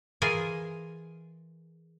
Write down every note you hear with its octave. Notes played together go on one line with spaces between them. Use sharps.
E3 F4 G#4 A#4 G#5